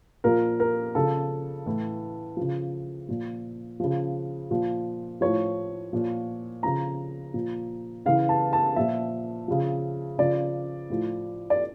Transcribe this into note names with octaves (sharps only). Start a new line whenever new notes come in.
A#2 F3 A#4
A#4
C#3 F3 A4
A2 E3
C#3 F3
A#2 F3
C#3 F3
A#2 F3
A2 F3 C#5
A#2 F3
C#3 F3 A#5
A#2 F3
C#3 E3 F5
A5
A5
A#2 F3 E5
C#3 F3
C#3 F3 D5
A2 F3
D5